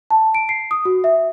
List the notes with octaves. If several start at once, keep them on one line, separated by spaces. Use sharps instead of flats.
A5
D7
C7
D#6
F#4
E5